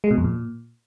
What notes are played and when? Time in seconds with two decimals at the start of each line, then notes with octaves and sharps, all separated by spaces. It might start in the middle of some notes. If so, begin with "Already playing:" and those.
0.04 G#3
0.11 B2
0.18 F2
0.24 A#2